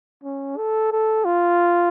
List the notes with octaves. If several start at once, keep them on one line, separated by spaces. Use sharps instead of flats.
C#4
A4
A4
F4